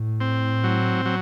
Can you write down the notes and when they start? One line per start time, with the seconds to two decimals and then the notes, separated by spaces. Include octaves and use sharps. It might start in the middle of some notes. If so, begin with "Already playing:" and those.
Already playing: A2
0.21 C4
0.64 F#3
1.05 F#3